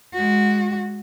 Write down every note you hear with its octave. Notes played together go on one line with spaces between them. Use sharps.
G#3 F#4